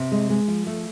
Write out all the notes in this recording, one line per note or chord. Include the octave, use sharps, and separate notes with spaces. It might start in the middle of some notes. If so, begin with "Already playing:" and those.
Already playing: C3
G#3
G#3
F3
A3